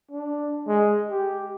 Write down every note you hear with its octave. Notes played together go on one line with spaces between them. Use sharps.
D4
G#3
G4